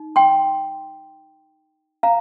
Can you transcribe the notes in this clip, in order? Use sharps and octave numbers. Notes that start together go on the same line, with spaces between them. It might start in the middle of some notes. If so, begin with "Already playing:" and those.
Already playing: D#4
G5 C6
F5 A#5